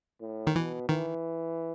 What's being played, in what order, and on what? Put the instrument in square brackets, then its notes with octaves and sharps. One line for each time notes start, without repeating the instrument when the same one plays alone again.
[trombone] A2
[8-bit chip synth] D#3
[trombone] B2 [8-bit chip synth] E3
[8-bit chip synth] D#3 [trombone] E3